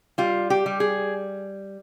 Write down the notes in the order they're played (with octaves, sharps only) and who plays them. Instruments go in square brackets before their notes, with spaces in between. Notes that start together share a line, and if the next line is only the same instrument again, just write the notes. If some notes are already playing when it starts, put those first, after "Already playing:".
[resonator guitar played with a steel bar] G3 F4
G4
G3
G#4